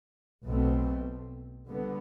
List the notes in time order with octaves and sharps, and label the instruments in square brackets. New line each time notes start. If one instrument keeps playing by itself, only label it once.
[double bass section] B1 B2 A3 C4
D3 G3 B3